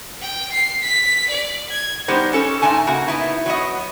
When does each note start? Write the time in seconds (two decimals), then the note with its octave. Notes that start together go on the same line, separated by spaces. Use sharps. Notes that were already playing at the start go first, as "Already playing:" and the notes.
0.21 G5
0.52 C7
0.82 B6
1.29 D5
1.70 G#6
2.08 G3 B3 D#4 G4 C5 D#5
2.33 C#4 A4 C#5 A5
2.62 G#2 A3 D#4 G#5 A5
2.87 C#3 A#3 F#4
3.08 B3 D#4 E4
3.46 F#3 B3 D#5